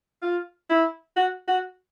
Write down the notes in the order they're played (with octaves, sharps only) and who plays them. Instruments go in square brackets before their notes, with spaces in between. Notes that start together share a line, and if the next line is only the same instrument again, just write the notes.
[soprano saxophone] F4
E4
F#4
F#4